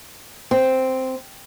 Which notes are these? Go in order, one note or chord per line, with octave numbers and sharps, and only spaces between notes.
C4